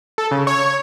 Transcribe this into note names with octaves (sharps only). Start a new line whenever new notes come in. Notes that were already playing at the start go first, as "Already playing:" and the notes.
A4
C#3
C#5
C#5